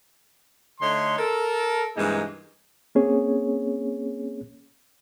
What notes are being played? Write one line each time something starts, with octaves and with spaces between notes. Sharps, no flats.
D3 A3 D#4 C#5 C6
A4 A#4
G2 C3 E3 G#3 A#3 D#4
A#3 C4 C#4 G#4 C#5